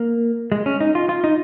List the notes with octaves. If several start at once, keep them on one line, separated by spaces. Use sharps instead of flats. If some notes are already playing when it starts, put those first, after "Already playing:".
Already playing: A#3
G#3
C#4
D#4
F4
F4
D#4